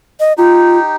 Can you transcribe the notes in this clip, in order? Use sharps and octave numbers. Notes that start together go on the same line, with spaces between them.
D#5
D#4 F4 G4